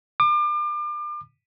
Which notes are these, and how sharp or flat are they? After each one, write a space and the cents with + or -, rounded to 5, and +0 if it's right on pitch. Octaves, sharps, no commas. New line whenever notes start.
D6 +35